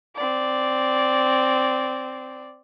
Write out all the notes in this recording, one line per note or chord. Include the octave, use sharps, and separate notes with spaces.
C4 D5